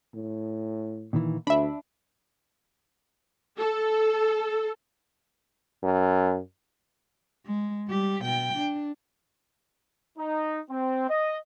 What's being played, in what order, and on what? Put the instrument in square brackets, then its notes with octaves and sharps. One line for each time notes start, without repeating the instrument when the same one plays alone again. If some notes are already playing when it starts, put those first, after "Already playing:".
[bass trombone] A2
[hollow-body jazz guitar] A#2 D#3 E3
[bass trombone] D2 [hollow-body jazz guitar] D4 [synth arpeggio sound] E5 B5
[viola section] A4
[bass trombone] F#2
[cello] G#3
G3 G4
B2 G5
D4
[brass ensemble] D#4
C4
D#5